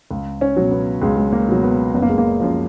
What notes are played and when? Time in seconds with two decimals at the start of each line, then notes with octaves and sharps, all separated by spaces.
0.11 C#2
0.41 C#4
0.57 B2 F#3
0.71 B3
1.02 C#2 G#3
1.17 G#3
1.32 A#3
1.48 B2 F#3
1.63 B3
1.94 F#1 B3
2.02 A#3
2.09 G#3
2.18 A#3
2.40 F#2 F3